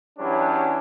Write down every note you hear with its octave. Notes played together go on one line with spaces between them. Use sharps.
E3 F#3 G3 C#4 D4